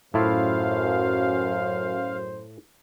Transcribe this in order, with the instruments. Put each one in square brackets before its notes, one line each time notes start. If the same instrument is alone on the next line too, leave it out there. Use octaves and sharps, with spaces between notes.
[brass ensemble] F#2 [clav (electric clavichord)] A2 E4 F4 [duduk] C5 [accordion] F5